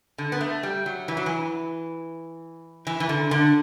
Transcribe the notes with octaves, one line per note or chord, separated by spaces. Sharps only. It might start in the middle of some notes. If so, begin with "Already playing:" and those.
D3
B3
A3
G3
F#3
E3
F#3
E3
E3
E3
D3
D3